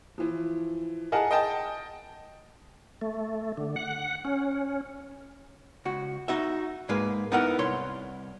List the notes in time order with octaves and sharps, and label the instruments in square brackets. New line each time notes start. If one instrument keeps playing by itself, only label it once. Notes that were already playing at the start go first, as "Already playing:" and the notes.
[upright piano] E3 F3
G#4 A#4 D#5 F#5 G#5 A5
D#5 G5 A5
[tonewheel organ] A3
D3
F#5
C#4
[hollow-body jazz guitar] C#2 F#4
D#4 F#4 E5
G#2 G#3 A#3 B4
B3 D#4 E4 A#4 F#5
C2 C#5 C6